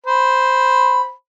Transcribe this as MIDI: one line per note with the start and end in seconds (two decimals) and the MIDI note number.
0.06 1.12 72
0.06 1.12 83